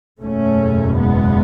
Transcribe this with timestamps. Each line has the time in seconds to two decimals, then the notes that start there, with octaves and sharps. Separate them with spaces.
0.21 F#1 E2 B2 A3 C#4
0.99 G#3 B3